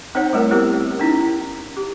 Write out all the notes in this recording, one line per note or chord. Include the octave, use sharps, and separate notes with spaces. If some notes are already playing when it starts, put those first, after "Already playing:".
C4 D#4 C5 C#5 F#5
G3 A3 E4 A#4
B3 C4 E4 G4 A#4
C#4 D#4 E4
G4